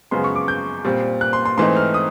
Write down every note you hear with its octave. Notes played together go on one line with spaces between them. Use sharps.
F#2 C#3 F3 G#3 B3 C6
C#6
D6
G6
A#2 G3 C4
F#6
C6
C6
G#2 E3 A3 C4 D#4 C6
F6
D#6